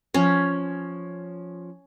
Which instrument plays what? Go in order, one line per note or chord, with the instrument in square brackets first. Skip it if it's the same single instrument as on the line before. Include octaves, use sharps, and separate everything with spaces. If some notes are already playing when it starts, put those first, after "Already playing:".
[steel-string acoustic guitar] F3 [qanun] C#4